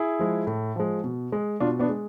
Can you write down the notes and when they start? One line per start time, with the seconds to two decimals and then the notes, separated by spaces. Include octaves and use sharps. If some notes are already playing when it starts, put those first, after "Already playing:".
Already playing: E4 G#4
0.19 F3 G#3
0.47 A2
0.76 F3 G#3
1.04 B2
1.32 G#3
1.60 B2 D4 F4
1.79 B3 D4
1.89 G#3